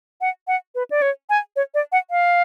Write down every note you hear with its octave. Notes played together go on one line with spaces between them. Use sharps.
F#5
F#5
B4
D5
C#5
G#5
C#5
D5
F#5
F5